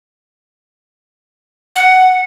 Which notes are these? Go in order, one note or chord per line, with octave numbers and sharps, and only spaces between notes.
F#5